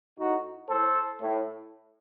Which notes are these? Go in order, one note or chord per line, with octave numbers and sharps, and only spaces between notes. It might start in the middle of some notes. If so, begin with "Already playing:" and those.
A2 D#4 F#4
A2 A4 C5
A2